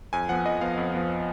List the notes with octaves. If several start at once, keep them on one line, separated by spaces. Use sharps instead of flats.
F2 G#5
F3 B3 F#5
F2 D#5
F3 B3 F5
F2
F3 B3